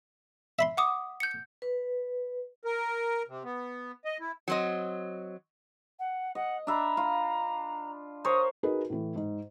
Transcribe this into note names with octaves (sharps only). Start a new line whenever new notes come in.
E5 B5 C6
F#5 D6 D#6
G6 C#7
B4
A#4
C3
B3
D#5
E4
F#3 C4 D#5
F#5
D#5 F#5
D4 E5 A#5 B5
F4
A#4 C5 C#5 D#6
D#4 F#4 G#4 A#4 B4
A2 E3
G#2